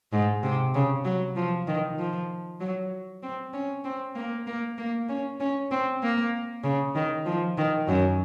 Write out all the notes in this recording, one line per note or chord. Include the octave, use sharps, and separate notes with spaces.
G#2
C3
C#3
F#3
F3
D#3
F3
F#3
C4
C#4
C4
A#3
A#3
A#3
C#4
C#4
C4
A#3
C#3
D#3
F3
D#3
F#2